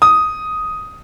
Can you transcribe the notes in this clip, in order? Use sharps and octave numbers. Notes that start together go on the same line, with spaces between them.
D#6